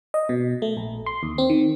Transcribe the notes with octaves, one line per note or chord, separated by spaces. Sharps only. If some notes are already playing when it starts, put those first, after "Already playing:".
D#5
B2
A3
A#1
C6
D#2
C4
D#3